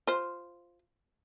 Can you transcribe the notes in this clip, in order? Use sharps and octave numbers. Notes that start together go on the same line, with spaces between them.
F4 C5